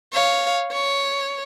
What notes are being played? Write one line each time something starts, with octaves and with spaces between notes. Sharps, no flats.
C#5 F5
C#5